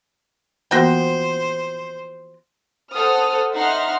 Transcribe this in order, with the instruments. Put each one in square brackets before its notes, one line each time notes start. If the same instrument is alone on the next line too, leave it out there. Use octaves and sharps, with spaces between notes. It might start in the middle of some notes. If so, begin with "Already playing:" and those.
[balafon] E3 A#3 B3 [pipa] F3 F#4 G5 [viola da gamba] C5
[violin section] A4 C5 F#5 D#6 F6
D#4 E5 F#5 C6 F6